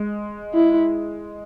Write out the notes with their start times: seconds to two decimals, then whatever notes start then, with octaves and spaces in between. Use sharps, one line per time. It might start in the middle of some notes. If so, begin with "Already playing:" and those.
Already playing: G#3
0.54 E4